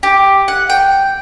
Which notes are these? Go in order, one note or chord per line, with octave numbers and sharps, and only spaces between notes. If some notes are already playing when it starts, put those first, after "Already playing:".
G4
F#5
G5